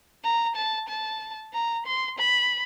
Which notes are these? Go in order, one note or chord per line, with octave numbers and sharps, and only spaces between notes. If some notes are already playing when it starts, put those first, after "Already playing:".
A#5
A5
A5
A#5
C6
B5